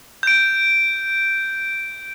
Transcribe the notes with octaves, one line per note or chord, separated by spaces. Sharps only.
G6 D7